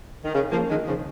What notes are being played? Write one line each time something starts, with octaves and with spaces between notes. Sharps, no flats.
D#3
C#3
F3 A#3
D#3 G#3
C#3 F3